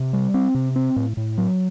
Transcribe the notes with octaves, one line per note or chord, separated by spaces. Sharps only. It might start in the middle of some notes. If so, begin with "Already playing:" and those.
Already playing: C3
G3
C4
C3
C4
A2
A2
F#3